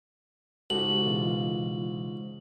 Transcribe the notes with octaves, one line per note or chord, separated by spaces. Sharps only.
C#2 G#2 F#4 G4 A4 F#7
B2 E3 F4